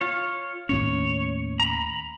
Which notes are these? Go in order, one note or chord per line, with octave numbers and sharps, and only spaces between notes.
F4 C#5
D#2 A2 C#4 C#5
A#5 B5